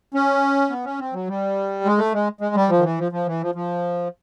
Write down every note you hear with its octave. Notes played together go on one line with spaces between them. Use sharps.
C#4
B3
C#4
C4
F#3
G3
G#3
A3
G#3
G#3
G3
F3
D#3
E3
F3
F3
E3
F3
F3